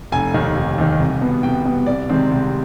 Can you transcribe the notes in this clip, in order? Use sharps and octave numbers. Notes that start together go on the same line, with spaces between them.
F1 G#5
D#2 D#3
F1
D#2 D#3
C2
B2 B3
C2 G5
B2 B3
C2 D5
C3 D#3 G#3 C4
C2